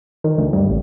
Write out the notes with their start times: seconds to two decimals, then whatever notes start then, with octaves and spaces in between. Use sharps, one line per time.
0.24 D#3
0.38 D2
0.53 G2
0.68 A1